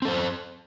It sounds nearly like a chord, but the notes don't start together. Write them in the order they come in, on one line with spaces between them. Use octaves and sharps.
C4 A4 C5